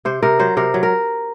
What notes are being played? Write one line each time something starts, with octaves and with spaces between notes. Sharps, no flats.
C3 C5
C3 A#4
F#3 C5
C3 A#4
F#3
A#4